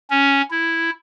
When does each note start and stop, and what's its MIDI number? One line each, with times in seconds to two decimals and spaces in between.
0.10 0.42 61
0.51 0.90 64